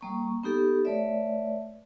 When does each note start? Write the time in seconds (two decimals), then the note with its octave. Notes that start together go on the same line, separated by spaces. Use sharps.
0.01 G3 A#3 C#6
0.43 B3 D#4 G4 A4
0.85 A3 B4 C#5 D5 E5